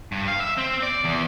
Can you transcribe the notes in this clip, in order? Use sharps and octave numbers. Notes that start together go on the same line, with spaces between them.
G2
F5
E5
C4
D5
E2